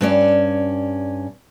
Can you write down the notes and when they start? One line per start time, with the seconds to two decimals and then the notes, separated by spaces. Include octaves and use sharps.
0.01 G2 C#4 D5